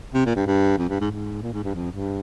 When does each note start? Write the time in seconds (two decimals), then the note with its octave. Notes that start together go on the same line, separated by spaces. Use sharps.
0.14 C3
0.26 A#2
0.36 G2
0.47 G2
0.78 F2
0.89 G2
1.01 G#2
1.11 G#2
1.42 A#2
1.53 G#2
1.64 G2
1.75 F2
1.91 G2